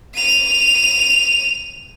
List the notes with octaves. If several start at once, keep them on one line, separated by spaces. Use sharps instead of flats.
D#7 F7